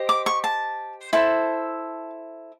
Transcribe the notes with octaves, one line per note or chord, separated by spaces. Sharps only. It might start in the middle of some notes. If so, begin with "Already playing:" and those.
Already playing: G4 C5 D#5
D6
C#6
A5
E4 A4 C5 A5